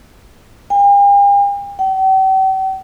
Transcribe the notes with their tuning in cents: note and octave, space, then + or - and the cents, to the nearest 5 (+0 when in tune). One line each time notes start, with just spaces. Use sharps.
G5 +45
G5 -45